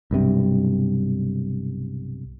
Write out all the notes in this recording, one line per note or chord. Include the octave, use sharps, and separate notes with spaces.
B1 G2 C3